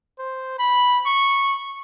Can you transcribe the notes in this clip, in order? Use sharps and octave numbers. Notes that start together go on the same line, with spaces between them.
C5
B5
C#6